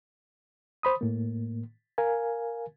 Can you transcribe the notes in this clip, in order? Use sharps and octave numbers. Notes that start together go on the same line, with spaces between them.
C5 B5 D#6
A2 A#3
A#4 F5 G#5